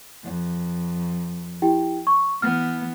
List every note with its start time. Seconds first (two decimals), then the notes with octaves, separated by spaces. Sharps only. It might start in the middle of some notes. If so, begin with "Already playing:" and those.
0.24 F2
1.62 E4 G4 G5
2.07 C#6
2.42 E3 B3 F6